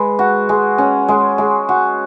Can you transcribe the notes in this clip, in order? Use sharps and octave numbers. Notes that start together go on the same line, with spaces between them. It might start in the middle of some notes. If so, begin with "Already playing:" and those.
Already playing: G#3 B4
F#4
G#3
C#4
G#3
G#3
F#4